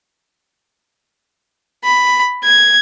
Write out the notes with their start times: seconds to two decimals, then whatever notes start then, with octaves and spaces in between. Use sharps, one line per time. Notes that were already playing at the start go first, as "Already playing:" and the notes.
1.84 B5
2.44 G#6